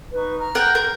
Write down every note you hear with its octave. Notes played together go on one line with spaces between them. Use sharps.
D#4 B4 C#6
A#5 F6
A#4 F#5 G5
A#4